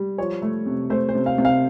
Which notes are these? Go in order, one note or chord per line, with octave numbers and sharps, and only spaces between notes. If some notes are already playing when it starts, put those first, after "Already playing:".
Already playing: G3
F3 C#5
A3
C3
A3 C5
C5
C3
F5
C3
F5